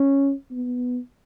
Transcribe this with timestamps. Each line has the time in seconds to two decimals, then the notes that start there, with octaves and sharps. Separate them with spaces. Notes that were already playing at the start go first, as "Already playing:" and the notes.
Already playing: C#4
0.51 B3